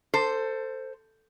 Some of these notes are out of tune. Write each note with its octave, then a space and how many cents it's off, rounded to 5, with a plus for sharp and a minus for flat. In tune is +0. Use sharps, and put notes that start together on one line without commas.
A4 +20 C5 +0